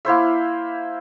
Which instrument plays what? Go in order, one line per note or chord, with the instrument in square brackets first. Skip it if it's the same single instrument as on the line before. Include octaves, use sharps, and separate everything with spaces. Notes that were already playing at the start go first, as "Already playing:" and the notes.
[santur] A#3 E4 C5 E5